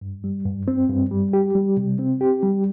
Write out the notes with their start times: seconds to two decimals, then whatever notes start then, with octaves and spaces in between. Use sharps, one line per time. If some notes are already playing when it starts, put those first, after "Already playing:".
0.01 G2
0.24 G3
0.45 G2
0.68 C4
0.89 G2
1.11 G3
1.33 G4
1.55 G3
1.77 C3
1.99 C4
2.21 G4
2.43 G3